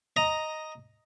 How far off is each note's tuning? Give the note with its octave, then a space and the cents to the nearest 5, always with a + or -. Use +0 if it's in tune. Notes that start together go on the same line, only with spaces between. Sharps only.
D#5 +0 A#5 +0